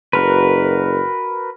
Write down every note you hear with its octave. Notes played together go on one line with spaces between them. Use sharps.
F#1 F#4 A#4 B4